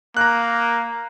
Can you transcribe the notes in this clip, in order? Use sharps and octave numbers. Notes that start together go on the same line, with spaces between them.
A#3 A#5 F#6